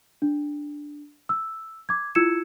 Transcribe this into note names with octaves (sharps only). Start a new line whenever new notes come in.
D4
E6
D6 G#6
E4 F4 E6 G#6 C#7 E7